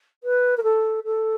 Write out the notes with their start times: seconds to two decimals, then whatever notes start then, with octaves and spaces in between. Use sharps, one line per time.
0.23 B4
0.57 A#4
0.63 A4
1.04 A4